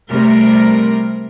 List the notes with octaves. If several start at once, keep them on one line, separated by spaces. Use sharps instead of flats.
C3 G3 A3 A#4